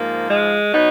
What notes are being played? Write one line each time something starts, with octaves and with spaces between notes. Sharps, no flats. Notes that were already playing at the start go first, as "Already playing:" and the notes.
Already playing: G#2 F3 A#3
G#3
B2 F#3 B3 D#4